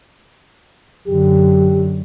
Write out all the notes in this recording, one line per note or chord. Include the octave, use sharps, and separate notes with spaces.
F#2 D3 G4